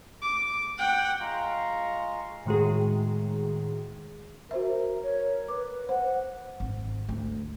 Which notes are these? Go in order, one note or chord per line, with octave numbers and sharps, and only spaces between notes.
D6
F#5 G5
G#3 F4 F5 A#5 C#6
A2 D#3 G#3 F#4 G#4
F#4 A#4 C5 E5
C#5
B4 D6
C5 F#5
G#1
D2